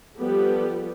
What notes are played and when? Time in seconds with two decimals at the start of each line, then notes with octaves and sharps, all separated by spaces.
0.17 F3 G3 B3 G4 A4